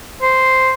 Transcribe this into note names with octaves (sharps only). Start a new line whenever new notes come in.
C5